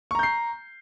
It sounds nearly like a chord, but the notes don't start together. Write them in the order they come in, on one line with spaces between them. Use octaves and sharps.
C#6 A#5 G6 C7